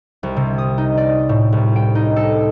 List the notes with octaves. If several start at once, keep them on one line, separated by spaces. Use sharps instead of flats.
C2
C3
D#6
D#4
D5
A2
C2
G5
D#4
A4